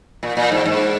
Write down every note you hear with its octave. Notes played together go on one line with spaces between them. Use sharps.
A#2
A#2
G#2
G#2